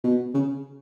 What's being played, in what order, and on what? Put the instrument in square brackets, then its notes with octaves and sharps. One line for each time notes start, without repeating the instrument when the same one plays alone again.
[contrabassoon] B2
C#3